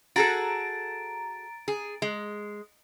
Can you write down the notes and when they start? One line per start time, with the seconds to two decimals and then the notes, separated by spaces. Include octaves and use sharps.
0.16 F#4 G#4 A4 A#5 A6 D7
1.68 G#4
2.02 G#3